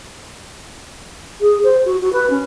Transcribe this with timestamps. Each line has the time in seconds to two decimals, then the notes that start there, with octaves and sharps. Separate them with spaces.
1.40 G#4
1.63 C5
1.85 F#4
2.01 F#4
2.13 B4
2.30 C#4